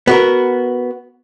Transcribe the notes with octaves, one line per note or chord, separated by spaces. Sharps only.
B3 F#4 A#4